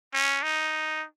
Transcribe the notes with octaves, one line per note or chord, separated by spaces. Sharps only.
C#4
D#4